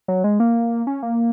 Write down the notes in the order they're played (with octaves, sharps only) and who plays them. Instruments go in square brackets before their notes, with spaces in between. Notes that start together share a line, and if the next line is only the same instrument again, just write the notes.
[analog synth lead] F#3
G#3
A#3
C#4
A#3